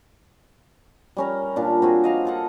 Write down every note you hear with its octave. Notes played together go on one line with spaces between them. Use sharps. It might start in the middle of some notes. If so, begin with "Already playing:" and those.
G3 C#4 A#4
A#2 D4
C4 F#4 G#4
D#5 F5 A#5
F4 A4 F#5